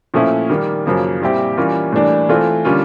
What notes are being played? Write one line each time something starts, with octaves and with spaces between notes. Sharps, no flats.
A#2 F3 A3 C#4 E4
D#3 G3 A#3
F#2 C#3 F3 A#3
A#2 G3 C4 E4 G4
E3 G3 A#3 C#4 F4
A2 E3 G3 A#3 D4
E3 A3 C4 F4
D3 G3 A#3 C#4 F4